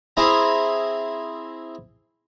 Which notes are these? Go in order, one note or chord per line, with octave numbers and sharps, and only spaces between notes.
C4 E4 G#4 A#5